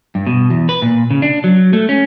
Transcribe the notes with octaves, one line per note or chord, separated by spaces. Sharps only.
G2
B2
E2
B4
A#2
C#3
D4
F#3
A3
C#4